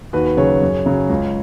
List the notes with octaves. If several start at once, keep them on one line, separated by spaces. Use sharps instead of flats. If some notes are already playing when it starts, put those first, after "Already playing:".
D#2 F#4 B4
B4
C#3 F#3 G#4 C#5
F#2
C#3 F#3
C#2